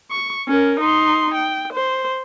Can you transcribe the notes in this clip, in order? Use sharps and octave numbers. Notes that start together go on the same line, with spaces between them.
C#6
C#4 A#4
D#4 C6
G5
C5